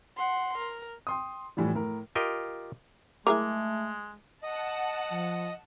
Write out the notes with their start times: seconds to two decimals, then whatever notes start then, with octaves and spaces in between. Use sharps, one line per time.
0.17 F#5 C6
0.58 A#4
1.07 G5 C6 D#6
1.57 A2 E3 F3 G3
1.75 A2 A#4
2.15 F4 G4 A#4 D#5
3.27 G#3 A3 E4 G#4 A#4 D6
4.43 D#5 F#5 A5
5.11 F3